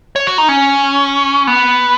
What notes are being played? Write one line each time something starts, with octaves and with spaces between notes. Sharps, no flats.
C#5
F#4
D#4
C#4
B3